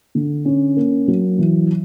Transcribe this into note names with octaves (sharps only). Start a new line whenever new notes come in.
D3
C#4
A#3
F#3
E3